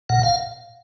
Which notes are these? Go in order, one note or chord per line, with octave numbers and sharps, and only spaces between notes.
A#2 F#5
F5